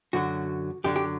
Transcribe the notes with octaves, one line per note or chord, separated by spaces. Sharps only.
F#2 D3 F#3 F#4
F#2 D3 F#3 G4
G4